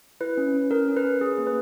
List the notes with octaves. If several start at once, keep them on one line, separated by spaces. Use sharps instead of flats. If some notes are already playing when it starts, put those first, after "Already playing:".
E4 B4
C#4
C#4
C#4 A#4
C#4
B4
C#4
G#4
A#3
B4